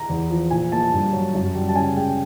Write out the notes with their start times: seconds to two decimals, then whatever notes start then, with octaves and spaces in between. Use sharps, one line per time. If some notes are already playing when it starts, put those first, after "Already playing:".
Already playing: A#5
0.09 E2
0.30 F3
0.51 A#2 G#5
0.72 A#3 A5
0.93 G2
1.13 F#3
1.35 F#2
1.55 G3
1.69 A5
1.75 C#3 G#5
1.96 G#3 G5